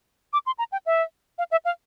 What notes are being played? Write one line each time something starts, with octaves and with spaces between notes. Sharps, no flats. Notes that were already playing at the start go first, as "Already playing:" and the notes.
D6
C6
A#5
G5
E5
F5
E5
F5